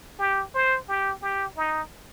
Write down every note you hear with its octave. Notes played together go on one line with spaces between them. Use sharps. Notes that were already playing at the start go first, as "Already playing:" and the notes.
G4
C5
G4
G4
D#4